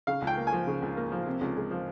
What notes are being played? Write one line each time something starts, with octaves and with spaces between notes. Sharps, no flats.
C#3 F5
C#2
G5
A#3
G#5
F3
C#3
C#2
A#3
F3
C3
C#2
G#3
F3